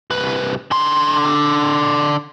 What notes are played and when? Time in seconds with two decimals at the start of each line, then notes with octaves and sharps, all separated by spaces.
0.10 C2 B4
0.71 D3 C6